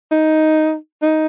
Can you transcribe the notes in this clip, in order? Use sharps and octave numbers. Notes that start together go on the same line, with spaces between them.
D#4
D#4